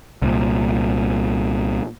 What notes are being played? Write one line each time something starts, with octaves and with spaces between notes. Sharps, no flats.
C2 A#2